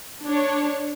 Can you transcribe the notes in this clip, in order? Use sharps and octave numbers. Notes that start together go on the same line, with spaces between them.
D4 C#5